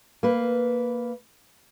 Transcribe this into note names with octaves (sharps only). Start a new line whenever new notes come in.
A#3 B4